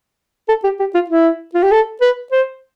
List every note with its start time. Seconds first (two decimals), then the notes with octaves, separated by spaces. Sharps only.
0.49 A4
0.64 G4
0.80 G4
0.94 F4
1.10 E4
1.54 F4
1.63 G4
1.72 A4
2.01 B4
2.32 C5